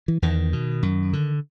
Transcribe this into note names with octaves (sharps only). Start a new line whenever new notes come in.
E3
E2 D#3
B2
F#2
D3